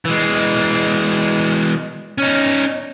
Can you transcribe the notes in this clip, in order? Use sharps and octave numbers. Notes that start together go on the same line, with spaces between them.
E3 G#3
C#4 D#4